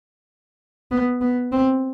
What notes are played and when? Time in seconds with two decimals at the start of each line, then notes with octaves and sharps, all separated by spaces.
0.91 B3
1.21 B3
1.52 C4